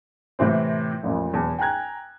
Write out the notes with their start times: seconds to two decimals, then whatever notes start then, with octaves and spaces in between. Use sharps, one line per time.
0.39 A2 C3 E3 C4
1.03 A1 F2 A#2
1.32 E1 E2 A5
1.58 G5 G#5 A#5 F#6 G#6